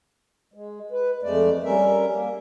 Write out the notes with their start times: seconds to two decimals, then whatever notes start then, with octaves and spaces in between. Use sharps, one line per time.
0.54 G#3
0.91 B4
1.23 F2 G#3 A3 D5
1.64 G3 C#4 A#4 E5
2.08 A#3